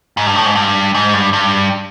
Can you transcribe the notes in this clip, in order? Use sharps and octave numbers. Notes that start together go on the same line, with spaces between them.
G#2
G2
A2
G#2
G2
G#2
G2
G2